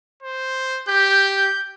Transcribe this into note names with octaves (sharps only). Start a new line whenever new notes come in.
C5
G4 G6